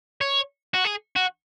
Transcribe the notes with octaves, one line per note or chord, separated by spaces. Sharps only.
C#5
F#4
G#4
F#4